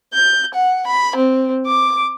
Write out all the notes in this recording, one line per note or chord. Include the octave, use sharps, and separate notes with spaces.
G6
F#5
B5
C4
D6